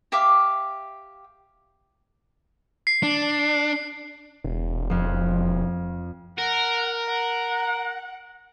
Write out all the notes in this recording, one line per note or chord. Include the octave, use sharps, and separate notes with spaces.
G4 E5 F5 D6
C7
D4
E1
F2 F3
A#4 F#5
F#5